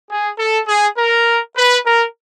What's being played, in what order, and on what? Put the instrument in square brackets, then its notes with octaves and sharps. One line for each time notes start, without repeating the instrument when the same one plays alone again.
[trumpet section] G#4
A4
G#4
A#4
B4
A#4